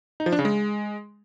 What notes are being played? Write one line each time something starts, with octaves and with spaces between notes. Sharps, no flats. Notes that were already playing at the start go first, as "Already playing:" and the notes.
D#4
F3
D4
C#3
G#3